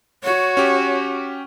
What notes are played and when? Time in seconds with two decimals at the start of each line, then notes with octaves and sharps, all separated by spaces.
0.23 F#4 C#5
0.57 C#4 G4